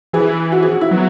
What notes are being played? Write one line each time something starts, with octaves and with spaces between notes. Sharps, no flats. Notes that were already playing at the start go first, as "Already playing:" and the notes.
E3 G#4
F#4
G#4
F#4
E4
F#3 B3